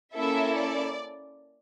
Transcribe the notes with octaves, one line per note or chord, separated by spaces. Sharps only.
A#3 C#4 E4 A4 E5
D5